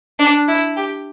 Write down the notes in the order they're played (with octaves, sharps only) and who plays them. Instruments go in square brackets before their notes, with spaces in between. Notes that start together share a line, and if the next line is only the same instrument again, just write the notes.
[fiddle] D4
E4
G4